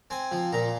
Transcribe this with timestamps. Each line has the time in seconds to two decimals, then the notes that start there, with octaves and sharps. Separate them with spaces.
0.10 C4 G#5
0.32 F3
0.52 A#2 A#5